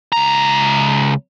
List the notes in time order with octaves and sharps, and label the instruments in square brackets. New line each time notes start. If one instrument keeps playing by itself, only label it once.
[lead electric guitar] C#2 A#5